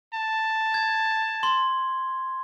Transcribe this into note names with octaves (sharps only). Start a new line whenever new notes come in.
A5
G#6
C6 G7